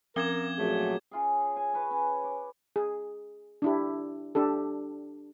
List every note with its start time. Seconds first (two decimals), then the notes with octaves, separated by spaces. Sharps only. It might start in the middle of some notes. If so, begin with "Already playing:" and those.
0.16 F3 C4 C#4 A#4 D6 G#6 G7
0.58 A#2 F#3 A3 G#4
1.11 C#3 F4 G#4
1.57 G#5
1.74 B4 C#5
1.91 C#4
2.24 D6
2.76 G#4
3.62 D4 E4 G4
4.35 D4 G4 A4